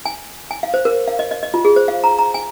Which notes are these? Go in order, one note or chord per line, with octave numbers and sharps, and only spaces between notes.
G#5
G#5
F5
C5
A#4
F5
D#5
D#5
D#5
F4
G#4
C5
F5
A#5
A#5
G#5